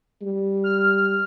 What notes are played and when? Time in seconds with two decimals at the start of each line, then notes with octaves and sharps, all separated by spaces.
0.22 G3
0.64 F6